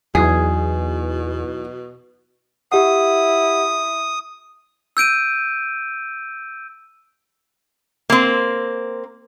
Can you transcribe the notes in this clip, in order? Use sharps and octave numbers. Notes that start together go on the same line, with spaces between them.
E2 B2 E3 F#3 D#4 G#4
E4 G4 F#5 D#6
E6 G6 D7 D#7
A#3 C4